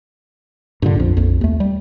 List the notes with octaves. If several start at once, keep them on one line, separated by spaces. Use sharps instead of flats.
G2 A#2 D3
A#1 F2
A#1 F2
D#2 A3
G3